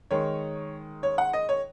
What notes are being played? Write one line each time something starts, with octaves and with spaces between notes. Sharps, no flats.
D#3 G#3 C#5
C#5
F#5
D#5
C#5